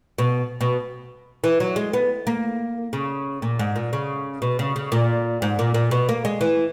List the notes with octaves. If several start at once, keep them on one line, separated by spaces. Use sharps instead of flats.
B2
B2
E3
F#3
G#3
B3
A#3
C#3
A#2
G#2
A#2
C#3
B2
C#3
C#3
A#2
G#2
A#2
A#2
B2
A#3
G#3
E3